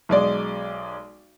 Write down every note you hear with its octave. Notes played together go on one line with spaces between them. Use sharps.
B1 G#3 D5